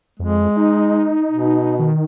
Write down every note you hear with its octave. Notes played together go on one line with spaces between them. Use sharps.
F2 G#3
D#4
B2
D#3